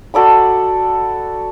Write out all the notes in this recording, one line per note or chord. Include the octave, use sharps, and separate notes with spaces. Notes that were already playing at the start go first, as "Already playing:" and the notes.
F#4 A4 D5 B5